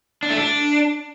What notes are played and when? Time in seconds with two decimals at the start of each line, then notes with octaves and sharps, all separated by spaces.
0.23 D4
0.30 A3
0.37 D4